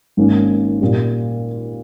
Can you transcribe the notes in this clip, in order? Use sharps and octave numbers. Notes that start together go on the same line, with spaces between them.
G#1 G#2 D#3 A#3 C#4
A#2 G3